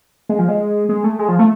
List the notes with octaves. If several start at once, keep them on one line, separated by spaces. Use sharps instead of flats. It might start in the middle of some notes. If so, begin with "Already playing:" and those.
G#3
F3
G#3
G#3
A3
G#3
F3
A3